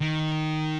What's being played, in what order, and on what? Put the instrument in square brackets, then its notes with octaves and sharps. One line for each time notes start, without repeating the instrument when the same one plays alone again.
[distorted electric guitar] D#3